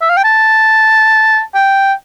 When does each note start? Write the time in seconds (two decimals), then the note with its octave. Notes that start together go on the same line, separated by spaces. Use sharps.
0.01 E5
0.09 F5
0.17 G5
0.24 A5
1.54 G5